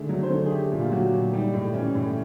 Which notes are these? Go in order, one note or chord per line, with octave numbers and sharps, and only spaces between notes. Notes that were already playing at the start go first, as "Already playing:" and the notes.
Already playing: D3 D#3 A3 G#4
F#3
C5
D3
G#4
A3 G4
A#2
F4
F#3 F#4
A#2
G3 D#4
A2
E3 C#4
A2